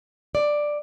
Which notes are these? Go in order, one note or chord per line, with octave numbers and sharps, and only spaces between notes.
D5